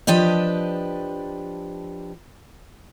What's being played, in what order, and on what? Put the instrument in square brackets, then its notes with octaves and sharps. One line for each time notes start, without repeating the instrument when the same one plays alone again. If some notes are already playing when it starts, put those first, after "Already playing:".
[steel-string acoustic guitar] F3 D4 G4 B4 D#5